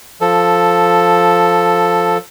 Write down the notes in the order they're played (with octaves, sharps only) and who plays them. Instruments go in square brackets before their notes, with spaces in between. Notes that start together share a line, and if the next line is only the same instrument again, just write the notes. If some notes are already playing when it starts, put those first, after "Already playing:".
[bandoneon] F3 A4